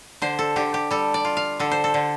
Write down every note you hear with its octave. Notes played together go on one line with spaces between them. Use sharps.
D3 C5
A4
D3 G4
G4
G3 A4
D5
F4
F5
D3 A4
C5
A4
D3